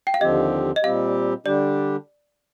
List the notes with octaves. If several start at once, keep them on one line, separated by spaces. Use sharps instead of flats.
G5
F5
D#2 D3 F3 C4 G4 D#5
D#5
A#2 G3 C4 G4 F5
D3 G3 D4 G4 D5